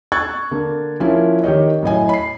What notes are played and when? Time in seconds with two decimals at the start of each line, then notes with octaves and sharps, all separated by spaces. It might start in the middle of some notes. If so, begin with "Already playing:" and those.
0.12 C#6 E6 F#6 G#6 A6
0.51 D3 A#3
1.00 F3 A#3 C#4 E4
1.44 D#3 G4 C#5 D#5
1.82 F#2 A2 D#5 G#5
2.09 B5 C7